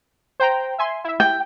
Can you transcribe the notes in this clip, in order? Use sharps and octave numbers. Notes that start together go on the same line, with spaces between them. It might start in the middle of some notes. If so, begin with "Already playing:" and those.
C5 G5 A#5
E5 G#5 C6
E4 E5
G5